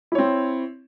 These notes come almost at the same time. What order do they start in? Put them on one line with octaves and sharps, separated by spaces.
E4 C#5 C4